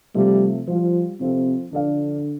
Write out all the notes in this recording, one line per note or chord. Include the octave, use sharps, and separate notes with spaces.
C3 F3 G3 A3
F3 G3 F4 C5
C3 F3 C4 A4
D3 F3 D4 A4 D5 F5